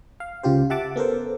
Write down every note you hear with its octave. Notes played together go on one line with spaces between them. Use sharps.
F5
C#2 C#3 F4 G4 C5
G4 E5 F#5 A5 D6
B3 A4 A#4 C5